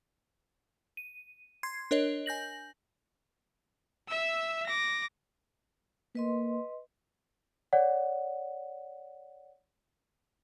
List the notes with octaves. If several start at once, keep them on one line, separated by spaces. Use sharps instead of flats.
D#7
C6 G#6 C7
D4 A#4 C#5 D#5
G#5 G6 A#6 F#7
E5 E6
D6 A#6
A#3 B4 D#5 C6
C#5 D5 F#5